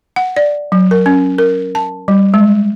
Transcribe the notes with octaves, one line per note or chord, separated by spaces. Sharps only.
F#5
D5
F#3
A#4
C#4
A#4
A5
G3
G#3